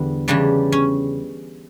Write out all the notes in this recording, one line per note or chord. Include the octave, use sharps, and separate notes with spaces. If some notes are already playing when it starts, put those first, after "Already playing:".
Already playing: E2 D3 G3
E2 C#3 G3 D4
C#4